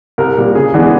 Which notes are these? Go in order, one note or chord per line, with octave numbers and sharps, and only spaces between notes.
C2 A#4
A#2 G3
C#3 G#4
E3 G#3 B3 D4